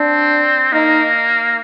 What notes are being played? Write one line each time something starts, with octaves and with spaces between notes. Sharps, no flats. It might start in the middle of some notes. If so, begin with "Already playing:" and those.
Already playing: C4 D4
A#3 D#4